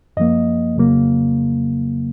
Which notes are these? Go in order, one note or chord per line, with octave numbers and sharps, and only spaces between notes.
F#2 F3 A#3 D#5
F2 C#3 F#3 A#3